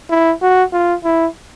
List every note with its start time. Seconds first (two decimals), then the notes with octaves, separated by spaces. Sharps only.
0.10 E4
0.41 F#4
0.72 F4
1.04 E4